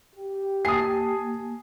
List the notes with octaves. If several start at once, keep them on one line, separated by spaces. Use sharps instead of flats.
G4
A#3 G#5 A5 D#6 C7